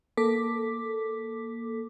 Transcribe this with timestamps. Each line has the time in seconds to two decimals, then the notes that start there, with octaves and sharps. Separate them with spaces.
0.17 A#3 A4 D6 B6